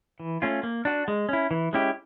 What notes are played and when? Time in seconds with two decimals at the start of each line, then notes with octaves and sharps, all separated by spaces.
0.20 E3
0.42 A3 C#4 F4
0.63 A#3
0.85 D4 F#4
1.08 G#3
1.29 C#4 E4
1.51 E3
1.73 G#3 C#4 E4 G4